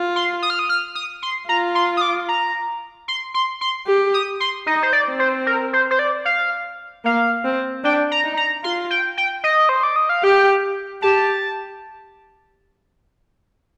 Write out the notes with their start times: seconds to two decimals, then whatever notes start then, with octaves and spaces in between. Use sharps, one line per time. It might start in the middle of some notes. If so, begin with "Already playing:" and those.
Already playing: F4
0.16 C6
0.42 D#6
0.50 F6
0.59 D#6
0.69 F6
0.95 D#6
1.22 C6
1.48 F4 A#5
1.75 C6
1.97 D#6
2.01 D6
2.29 A#5
3.08 C6
3.34 C6
3.61 C6
3.87 G4
4.14 D#6
4.40 C6
4.67 D#4 D#5
4.83 C5
4.93 D5
5.07 C4
5.19 C5
5.46 A#4
5.73 C5
5.91 C5
5.99 D5
6.25 F5
7.05 A#3 F5
7.44 C4
7.84 D4 G5
8.11 A#5
8.24 D#4
8.37 A#5
8.64 F4 C6
8.90 G5
9.17 G5
9.44 D#5
9.69 C5
9.83 D5
9.96 D#5
10.09 F5
10.23 G4 G5
11.02 G4 A5